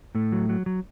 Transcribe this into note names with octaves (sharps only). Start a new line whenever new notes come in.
A2 A3
F#3
F#3
F#3